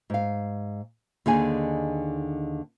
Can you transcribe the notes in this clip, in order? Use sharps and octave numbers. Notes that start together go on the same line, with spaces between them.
G#2 F5
D#2 D3 D#4 G#4 G#5